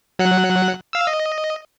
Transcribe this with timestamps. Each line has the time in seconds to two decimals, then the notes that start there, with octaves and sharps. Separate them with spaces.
0.19 F#3 F#5 F#6
0.93 F5 E6
1.07 D#5